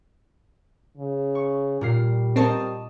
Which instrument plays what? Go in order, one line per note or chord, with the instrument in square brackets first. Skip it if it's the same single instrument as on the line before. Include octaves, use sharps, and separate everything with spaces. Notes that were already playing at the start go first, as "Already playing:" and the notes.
[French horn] C#3
[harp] C#6
[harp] A#2 A#4 C7 [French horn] G3
[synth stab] C4 A#4 [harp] D#5 A5 C#6